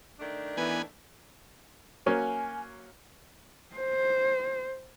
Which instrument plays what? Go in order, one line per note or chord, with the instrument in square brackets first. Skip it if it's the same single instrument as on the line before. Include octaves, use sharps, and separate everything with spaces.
[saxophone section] D#3 A3 D4
[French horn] E3 [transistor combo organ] B3 G#5
[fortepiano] F#3 A#3 C#4 [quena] G#5
[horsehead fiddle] C5